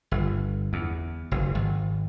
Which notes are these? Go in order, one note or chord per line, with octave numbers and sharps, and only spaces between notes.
G1
E2
F#1
G#1